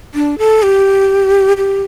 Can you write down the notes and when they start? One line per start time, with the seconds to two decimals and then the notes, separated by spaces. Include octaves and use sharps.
0.15 D4
0.38 A4
0.63 G4
1.57 G4